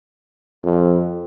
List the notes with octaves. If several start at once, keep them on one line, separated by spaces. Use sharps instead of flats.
F2